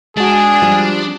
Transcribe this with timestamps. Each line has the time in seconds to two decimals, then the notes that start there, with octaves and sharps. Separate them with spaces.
0.17 G#3 D4 F#4 G#4
0.62 F3 G3